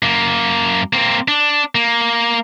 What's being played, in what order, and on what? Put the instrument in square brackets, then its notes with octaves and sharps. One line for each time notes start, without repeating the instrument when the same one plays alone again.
[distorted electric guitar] F#2 A#3
A#3 C4
D4
A#3